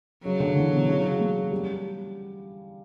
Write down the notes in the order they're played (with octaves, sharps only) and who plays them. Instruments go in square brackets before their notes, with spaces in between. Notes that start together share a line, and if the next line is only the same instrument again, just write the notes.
[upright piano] C#3 [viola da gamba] F#3
[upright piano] D3
E3
B2
C#3
C#3
A#3
G3